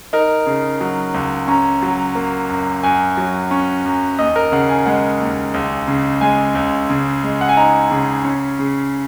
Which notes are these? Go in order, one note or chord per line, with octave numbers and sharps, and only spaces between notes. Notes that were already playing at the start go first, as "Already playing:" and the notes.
D#4 A#4
C#3
F#3
C#2
C#4 A#5
F#3
A#3
F#2
F#2 G#5
F#3
C#4
F#2
D#2 D#5
A#4
C#3 F#5
G#5
G#3 F#5
D#2
C#2
C#3
G#3 G#5
C#2
C#3
G#3
F#5
G#5
D#4 A#5
C#3
C#4
C#3